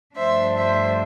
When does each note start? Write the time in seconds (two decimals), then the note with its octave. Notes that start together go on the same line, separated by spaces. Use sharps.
0.15 G2 F3 A3 D4 C5 E5
0.56 C5 E5